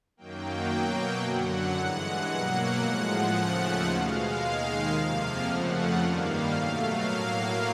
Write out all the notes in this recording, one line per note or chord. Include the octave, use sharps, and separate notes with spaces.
F#2 D#3 F#3 A#3 G5
B2 F#3 A#3
F#2 D3 F#3 F#5
G2 E3 G#3 F#5
B2 F#3 A#3
A2 F3 G#3
D#2 C#3 F3 A3 F#5
B2 G#3 F5
D#2 D#3 G#3
F2 C3 F3 A#3 F5
F2 C#3 F3 A3 F#5
G2 D#3 G3 A#3 F5
B2 F#3 A3
A2 F#3 A#3 F5